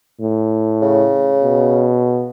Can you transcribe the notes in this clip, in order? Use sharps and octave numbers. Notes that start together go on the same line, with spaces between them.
A2
C#3
B2